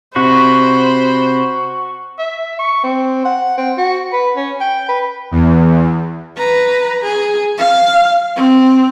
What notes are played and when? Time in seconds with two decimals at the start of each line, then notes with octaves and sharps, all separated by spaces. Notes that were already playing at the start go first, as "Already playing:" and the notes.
0.16 C3 F#4 C5 B5
2.19 E5
2.59 C#6
2.83 C4
3.25 F#5
3.58 C4
3.78 F#4
4.13 B4
4.36 C#4
4.61 G5
4.89 B4
5.31 E2
6.37 B4 A#5
7.03 G#4
7.58 F5
8.36 C4